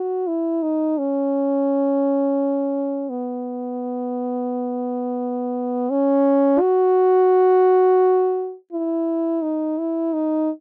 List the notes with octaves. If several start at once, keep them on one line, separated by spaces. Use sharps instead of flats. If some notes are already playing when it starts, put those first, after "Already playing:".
Already playing: F#4
E4
D#4
C#4
B3
C#4
F#4
E4
D#4
E4
D#4